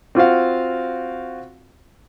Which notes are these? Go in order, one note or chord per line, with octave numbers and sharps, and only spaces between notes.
C4 F4 F#4 F5